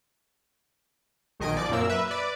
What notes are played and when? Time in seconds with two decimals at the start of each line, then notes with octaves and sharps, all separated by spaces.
1.40 B1 D#3 D#5 G#5 D7
1.55 F3 D5 F#6
1.69 F#2 A#2 F#3 A#3 A#4 E6
1.90 B4 E5
2.08 B4 D5